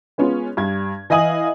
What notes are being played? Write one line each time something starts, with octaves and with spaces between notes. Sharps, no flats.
G#3 B3 C#4 F4
G2 G#6
E3 D#5 F5 G#5 D#6 F#7